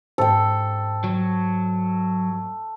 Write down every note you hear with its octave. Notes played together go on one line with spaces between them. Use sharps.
G#2 A4 C5 G5
F#3